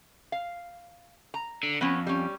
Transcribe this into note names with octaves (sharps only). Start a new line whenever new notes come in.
F5
A#5
D3
F2 B3 C#4
G3 C#4